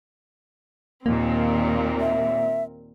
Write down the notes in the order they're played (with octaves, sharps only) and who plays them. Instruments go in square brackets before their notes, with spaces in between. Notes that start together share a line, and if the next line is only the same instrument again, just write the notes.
[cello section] D#2 A#2 [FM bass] A#3 [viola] C4 A#4
[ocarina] E5